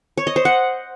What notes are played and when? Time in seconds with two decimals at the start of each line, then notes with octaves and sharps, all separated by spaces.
0.17 C#5
0.27 D#5
0.36 C5
0.45 F#5